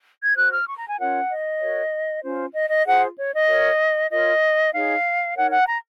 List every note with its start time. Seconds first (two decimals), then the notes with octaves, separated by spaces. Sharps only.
0.24 G#6
0.36 F#4 C5 F#6
0.51 F6
0.67 C#6
0.77 A#5
0.88 G#5
0.98 C#4 F4 A#4 C#5 F#5
1.30 D#5
1.60 F#4 A#4 C#5
2.24 C#4 F4 C5
2.54 D#5
2.70 D#5
2.85 F4 G#4 C5 F#5
3.17 C#5
3.32 D#5
3.47 F#4 A#4 C#5
4.10 F4 A#4 C#5 D#5
4.73 D#4 G#4 C#5 F5
5.35 D#4 A#4 C#5 F#5
5.50 F#5
5.67 A#5